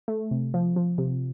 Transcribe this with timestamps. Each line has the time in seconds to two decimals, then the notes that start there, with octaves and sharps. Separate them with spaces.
0.08 A3
0.31 C3
0.54 F3
0.76 F3
0.98 C3